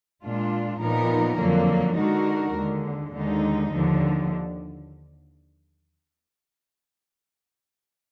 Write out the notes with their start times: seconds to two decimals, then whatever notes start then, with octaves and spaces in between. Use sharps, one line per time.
0.22 A#2 G#3 D4 F4
0.80 A#2 F3 B3 D#4 A#4
1.38 F2 D3 F#3 A#3
1.96 D3 G#3 D#4 F#4 A#4
2.54 D#2 D3 G#3
3.12 D#2 D3 G#3 D#4
3.71 D#2 D3 F3